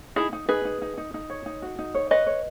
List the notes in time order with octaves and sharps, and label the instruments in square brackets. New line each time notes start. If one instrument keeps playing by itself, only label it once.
[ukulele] D#4 [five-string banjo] E4 G#4
[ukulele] D#4
[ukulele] D#4 [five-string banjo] G#4 B4
[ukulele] D#4
D#4
D#4
D#4
C#5
D#4
F#4
D#4
C#5
[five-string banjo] B4 D#5 [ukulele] C#5
[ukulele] C#5